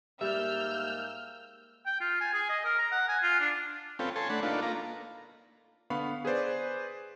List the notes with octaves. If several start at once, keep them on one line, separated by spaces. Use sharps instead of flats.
G#2 G3 G#3 A#3 E5 E6 F6 G6
G5
F4
G#5
G#4
D#5
A#4
A#5
F#5
G#5
F4
D4
C4 C#4 F4 A4 B4 G5
A4 C#5 G#5 A5 C6
A3 D4 F#5 A5 B5
A#3 D4 D#4 F4 A4 B4
A#3 F4 A#5
D3 B3 F5 B5 C#6
G#4 B4 C5 D5